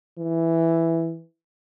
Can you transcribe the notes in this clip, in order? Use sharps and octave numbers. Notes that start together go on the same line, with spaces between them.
E3